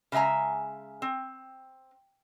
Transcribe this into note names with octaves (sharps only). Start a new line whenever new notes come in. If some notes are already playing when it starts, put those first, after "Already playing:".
C#3 G#3 E5 G#5 A#5
C4